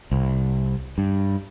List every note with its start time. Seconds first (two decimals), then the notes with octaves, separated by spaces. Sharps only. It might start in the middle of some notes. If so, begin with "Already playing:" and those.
0.11 C2
0.98 G2